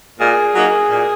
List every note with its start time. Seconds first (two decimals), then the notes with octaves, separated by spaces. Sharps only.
0.19 A#2 G#4
0.55 F#3 A#3 D#4
0.89 A#2